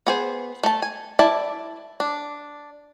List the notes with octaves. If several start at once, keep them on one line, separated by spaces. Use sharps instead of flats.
B3 G#4 C5
A3 A5
G#5
E4 D5 E5 A5
D4